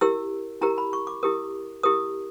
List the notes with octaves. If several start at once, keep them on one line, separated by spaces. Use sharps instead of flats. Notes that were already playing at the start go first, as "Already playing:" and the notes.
E4 G4 A#4 E6
E4 G4 A#4 A#5
B5
C#6
D6
E4 G4 A#4 D#6
E4 G4 A#4 D#6